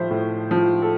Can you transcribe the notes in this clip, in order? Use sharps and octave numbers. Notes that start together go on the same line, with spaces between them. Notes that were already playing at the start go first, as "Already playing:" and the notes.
Already playing: A2 F3 C5 E5
A2
F3
A4